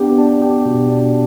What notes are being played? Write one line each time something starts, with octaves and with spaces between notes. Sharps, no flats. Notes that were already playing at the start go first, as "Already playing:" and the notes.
Already playing: B3 D4 G4
D4
G4
B2
D4